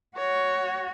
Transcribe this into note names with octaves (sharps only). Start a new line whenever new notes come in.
F#4 C#5